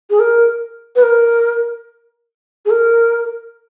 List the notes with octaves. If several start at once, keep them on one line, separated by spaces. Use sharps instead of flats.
G#4
A#4
B4
A#4
G#4
A#4